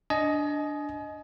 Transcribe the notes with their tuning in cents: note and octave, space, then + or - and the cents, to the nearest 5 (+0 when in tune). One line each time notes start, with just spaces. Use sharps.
D4 +0 D#5 +0 G#5 +35